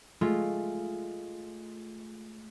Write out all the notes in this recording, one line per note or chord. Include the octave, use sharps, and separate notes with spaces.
G#3 A3 F4